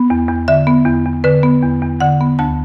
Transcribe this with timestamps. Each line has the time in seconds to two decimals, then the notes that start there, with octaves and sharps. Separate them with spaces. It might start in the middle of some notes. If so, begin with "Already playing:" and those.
Already playing: B3
0.10 E2
0.29 E2
0.48 D3 E5
0.67 B3
0.86 E2
1.05 E2
1.24 D3 B4
1.43 B3
1.62 E2
1.82 E2
2.00 D3 F#5
2.21 B3
2.39 D2 A5